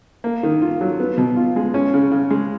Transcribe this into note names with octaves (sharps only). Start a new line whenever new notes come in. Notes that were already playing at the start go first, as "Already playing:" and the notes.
A#3
D#3
F4
F#3
B3
B2
F4
G#3
C#4
C#3
C#3
G#3